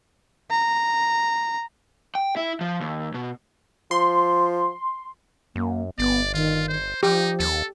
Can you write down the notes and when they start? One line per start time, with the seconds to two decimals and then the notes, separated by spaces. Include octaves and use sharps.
0.51 A#5
2.15 G5
2.36 E4
2.61 F3
2.80 D#2
3.14 B2
3.91 F3 C6
5.56 F#2 A#3
5.98 G1 B3 D5
6.34 D#3 F4
6.68 C5
7.03 F3 D#4 G4
7.40 D#2 A4